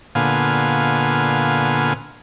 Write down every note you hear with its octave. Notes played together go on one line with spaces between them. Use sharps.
A#2 D3 B3 F5 G#5